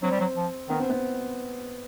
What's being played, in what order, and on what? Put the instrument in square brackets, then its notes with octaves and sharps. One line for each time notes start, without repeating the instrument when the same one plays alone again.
[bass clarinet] F#3 [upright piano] C4
[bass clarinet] G3
F#3
F3
[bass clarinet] D#3 [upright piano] B3
[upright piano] C4
B3